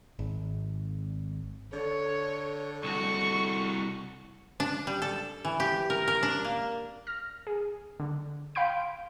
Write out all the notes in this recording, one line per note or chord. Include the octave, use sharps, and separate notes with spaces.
G#1
D3 A4 C#5
C2 F#4 C#6
D4
G3
A4
E3
G4
A#4
A#4
D4
A#3
F6 A#6
G#4
D3
F5 G5 B5 C6 G6 D7